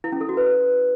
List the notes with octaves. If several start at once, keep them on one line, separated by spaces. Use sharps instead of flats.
E4
C#4
A4
F#4
B4